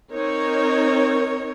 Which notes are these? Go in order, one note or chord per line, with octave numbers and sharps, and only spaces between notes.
C4 D#4 A#4 C#5